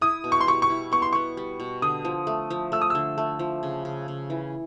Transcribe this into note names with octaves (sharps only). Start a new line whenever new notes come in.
E4 D#6
B2
C#6
C6
G3 C#6
C#6
E4
B3 C#6
C6
B3 C#6
G3
B2
D3 D#6
F3
A3
F3
A3 E6
D#6
D3 E6
A3
F3
C#3
C#3
C#3
E3